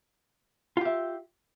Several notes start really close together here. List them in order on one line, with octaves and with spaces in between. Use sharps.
F4 G4 E5